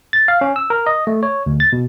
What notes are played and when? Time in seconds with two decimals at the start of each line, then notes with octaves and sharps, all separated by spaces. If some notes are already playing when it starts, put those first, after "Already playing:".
0.13 A6
0.28 F5
0.41 C#4
0.56 E6
0.70 A#4
0.87 D#5
1.07 A3
1.23 C#5
1.46 D2
1.60 A6
1.73 B2